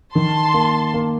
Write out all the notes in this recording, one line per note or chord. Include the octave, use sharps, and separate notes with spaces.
D#3 A5 C6
A#3
A#3